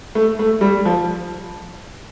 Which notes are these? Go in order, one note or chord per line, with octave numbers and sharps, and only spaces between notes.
A3
A3
G3
F3